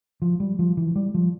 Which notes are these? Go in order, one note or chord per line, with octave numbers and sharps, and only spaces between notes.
F3
G3
F3
E3
G3
F3